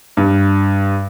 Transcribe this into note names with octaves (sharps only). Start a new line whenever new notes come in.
G2